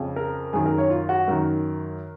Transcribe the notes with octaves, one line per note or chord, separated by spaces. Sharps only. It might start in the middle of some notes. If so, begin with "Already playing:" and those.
Already playing: F2 C#3
A#4
F#2 D#3 G#4
A#4
C#5
F4
F#4
F#2 D#3 A#4